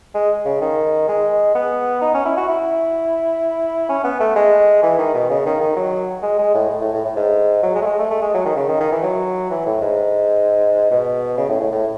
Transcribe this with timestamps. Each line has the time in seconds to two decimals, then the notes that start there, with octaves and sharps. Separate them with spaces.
0.14 G#3
0.46 C#3
0.61 D#3
1.08 G#3
1.55 B3
2.01 D#4
2.14 C#4
2.25 E4
2.37 F#4
2.49 E4
3.89 C#4
4.04 B3
4.20 A3
4.36 G#3
4.83 E3
4.98 D#3
5.14 B2
5.30 C#3
5.46 D#3
5.60 D#3
5.76 F#3
6.22 G#3
6.39 G#3
6.54 A2
6.69 A2
6.81 A2
6.94 A2
7.05 A2
7.16 G#2
7.63 F#3
7.75 G#3
7.82 A3
7.86 G#3
7.99 A3
8.10 A3
8.22 G#3
8.34 F#3
8.45 D#3
8.56 C#3
8.68 D#3
8.80 D#3
8.91 E3
9.03 F#3
9.50 E3
9.66 A2
9.81 G#2
10.91 B2
11.37 C#3
11.49 A2
11.61 A2
11.72 A2